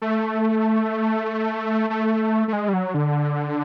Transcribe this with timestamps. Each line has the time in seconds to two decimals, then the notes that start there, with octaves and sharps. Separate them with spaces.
0.02 A3
1.90 A3
2.48 A3
2.53 G#3
2.68 G3
2.73 F#3
2.94 D3